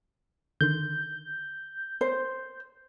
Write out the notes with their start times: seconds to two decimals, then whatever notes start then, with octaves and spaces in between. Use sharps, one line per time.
0.61 D3 D#3 C6 G6
2.01 C5